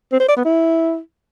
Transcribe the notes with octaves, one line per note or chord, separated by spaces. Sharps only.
C4
C5
D5
B3
E4